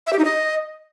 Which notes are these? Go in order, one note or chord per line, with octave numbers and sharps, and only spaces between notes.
E5
G4
D#4
D#5